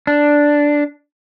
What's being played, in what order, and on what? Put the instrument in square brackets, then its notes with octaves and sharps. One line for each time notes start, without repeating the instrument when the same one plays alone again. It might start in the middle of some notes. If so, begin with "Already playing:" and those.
[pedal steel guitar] D4